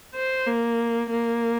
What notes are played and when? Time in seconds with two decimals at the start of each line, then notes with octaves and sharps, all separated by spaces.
0.15 C5
0.47 A#3
1.11 A#3